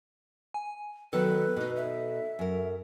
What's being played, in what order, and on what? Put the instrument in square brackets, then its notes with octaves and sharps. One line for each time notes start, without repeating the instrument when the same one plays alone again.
[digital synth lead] G#5
[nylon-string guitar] D#3 F#3 B3 [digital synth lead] A4 [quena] B4
[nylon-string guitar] B2 D#4
[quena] E5
[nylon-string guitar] F#2 A#4